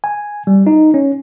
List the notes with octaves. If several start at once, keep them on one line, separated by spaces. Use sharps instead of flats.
G#5
G3
D#4
C#4